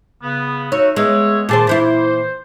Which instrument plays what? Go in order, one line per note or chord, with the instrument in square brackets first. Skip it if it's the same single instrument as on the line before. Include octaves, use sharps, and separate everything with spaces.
[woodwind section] C#3 B3
[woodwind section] D#4 F#4 E5 [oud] C#5
[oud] G#3 B3 [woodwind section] G#4 C#5 E5
[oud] A#2 G#4 C5 [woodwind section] D#3 A5 D6
[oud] A#2 E3 E4 [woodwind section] C5